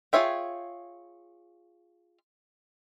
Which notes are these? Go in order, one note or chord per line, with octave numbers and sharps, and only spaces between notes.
F4 G#4 C#5 E5 G5